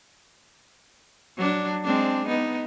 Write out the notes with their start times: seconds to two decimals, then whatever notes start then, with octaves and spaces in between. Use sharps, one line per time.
1.37 F#3 D4
1.84 G#3 C4 D4
2.26 B3 D#4